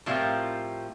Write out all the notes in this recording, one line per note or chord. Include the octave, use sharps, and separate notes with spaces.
A2 F3 G3 C4 F4 A#4